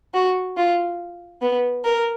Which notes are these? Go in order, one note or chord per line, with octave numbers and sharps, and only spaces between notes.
F#4
F4
B3
A#4